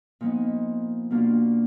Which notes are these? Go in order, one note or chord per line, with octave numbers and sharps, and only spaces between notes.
A#2 F3 B3 D#4
B2 A#3 D4 F4